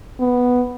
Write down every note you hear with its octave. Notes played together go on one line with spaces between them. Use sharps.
B3